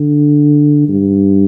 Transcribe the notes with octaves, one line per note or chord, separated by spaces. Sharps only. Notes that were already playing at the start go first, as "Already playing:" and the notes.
Already playing: D3
G2